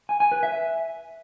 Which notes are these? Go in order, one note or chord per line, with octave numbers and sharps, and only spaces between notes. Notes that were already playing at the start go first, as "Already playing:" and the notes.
G#5
G#5
B4
E5